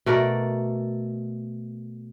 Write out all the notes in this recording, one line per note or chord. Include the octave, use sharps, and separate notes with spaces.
B2 A3 A#4 D5